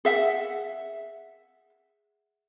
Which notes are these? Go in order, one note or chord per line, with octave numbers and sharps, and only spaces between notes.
G#4 E5 F#5